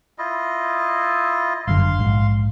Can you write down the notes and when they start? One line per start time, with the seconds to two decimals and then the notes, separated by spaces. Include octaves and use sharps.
0.18 E4 F4 D#5
1.67 G1 F#2 D3 F5 C6
1.98 A#1 G#2